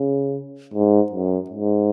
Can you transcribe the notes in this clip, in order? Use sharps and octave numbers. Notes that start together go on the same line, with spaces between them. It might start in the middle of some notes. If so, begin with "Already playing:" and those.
Already playing: C#3
G#2
F#2
G#2